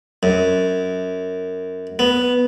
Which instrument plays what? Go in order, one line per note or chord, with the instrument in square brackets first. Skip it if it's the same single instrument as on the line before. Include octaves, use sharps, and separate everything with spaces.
[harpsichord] F#2
B3